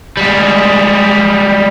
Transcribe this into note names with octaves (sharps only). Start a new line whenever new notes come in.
G3 G#3